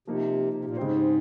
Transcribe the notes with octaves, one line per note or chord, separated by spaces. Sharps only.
C3 F3 A#3 D#4
C3
A#2
G#2 C#3 G#3 C4 G4 C5